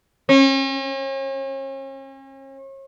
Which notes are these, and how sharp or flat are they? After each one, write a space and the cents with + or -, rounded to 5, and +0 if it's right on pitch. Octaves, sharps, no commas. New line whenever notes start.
C#4 -40